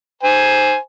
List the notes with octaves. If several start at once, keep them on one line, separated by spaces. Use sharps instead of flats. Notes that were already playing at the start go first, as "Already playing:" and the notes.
C5 G#5